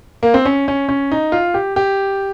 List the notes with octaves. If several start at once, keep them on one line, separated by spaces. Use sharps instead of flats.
A#3
C4
C#4
C#4
C#4
D#4
F4
G4
G4